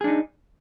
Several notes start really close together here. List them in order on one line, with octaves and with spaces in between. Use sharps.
G#4 D4 D#4